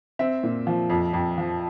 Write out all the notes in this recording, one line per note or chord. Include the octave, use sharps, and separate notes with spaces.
C4 E5
A#2
F3
F2
F2
F3